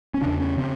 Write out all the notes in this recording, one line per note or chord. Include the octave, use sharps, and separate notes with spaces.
C#4
E2 C#3 D4
C#4
C#3 C4